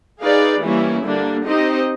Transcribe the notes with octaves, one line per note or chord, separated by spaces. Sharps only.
D#4 G#4 B4 D5 F5
E3 G3 A#3 C#4 E4
D3 G3 A#3 D4
C4 D#4 G4 C5 D#5